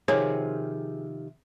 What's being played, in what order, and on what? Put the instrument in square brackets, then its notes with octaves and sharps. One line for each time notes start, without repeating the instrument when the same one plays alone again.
[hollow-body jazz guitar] C3 D#3 F3 [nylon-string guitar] G#4 [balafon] C#5